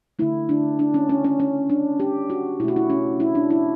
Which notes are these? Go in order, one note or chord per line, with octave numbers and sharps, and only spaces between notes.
D3 A3 E4
D4
D4
C#4
C#4
C#4
C#4
D4
G4
F#4
B2 A3 E4 F#4
E4
C#4
E4
D4
E4